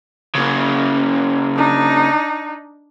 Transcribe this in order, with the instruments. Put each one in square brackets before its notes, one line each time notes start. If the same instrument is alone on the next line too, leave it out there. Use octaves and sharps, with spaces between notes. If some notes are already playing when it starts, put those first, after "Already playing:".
[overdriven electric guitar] C#3 A#3
[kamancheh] D4 D#4